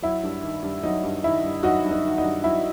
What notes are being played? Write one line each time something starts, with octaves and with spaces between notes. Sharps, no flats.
F#3 E4
G2
D#3
G2
F#3 D#4
G2
D#3 E4
G2
F#3 D#4 F#4
G2
D#4
D#3
D#4
G2
F#3 E4